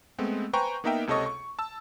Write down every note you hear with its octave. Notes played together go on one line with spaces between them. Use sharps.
G#3 A3 B3 C4
B4 C5 G5 G#5 A#5 C#6
A#3 B3 D#4 A#4 E5 G5
C#2 C3 A4 C#5 D#5 C#6
C#6
A5 E6